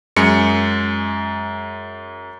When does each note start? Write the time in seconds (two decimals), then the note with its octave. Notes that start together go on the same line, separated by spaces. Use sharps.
0.16 F#2 G#3 C#7